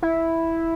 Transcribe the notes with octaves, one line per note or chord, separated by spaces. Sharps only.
E4